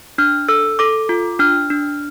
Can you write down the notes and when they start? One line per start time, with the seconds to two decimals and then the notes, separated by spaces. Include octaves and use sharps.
0.18 D4 F6
0.49 A4 E6
0.79 A4 D6
1.09 F4
1.39 D4 F6
1.70 D4